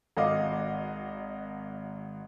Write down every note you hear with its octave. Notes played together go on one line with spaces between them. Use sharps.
G#1 F#4 D#5 F5 D6